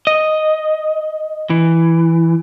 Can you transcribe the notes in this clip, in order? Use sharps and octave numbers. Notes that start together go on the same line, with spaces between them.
D#5
E3